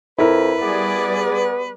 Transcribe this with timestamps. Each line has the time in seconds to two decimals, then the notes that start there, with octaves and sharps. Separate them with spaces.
0.18 F2 E4 A#4 B4
0.62 G3 B3 G#4 D5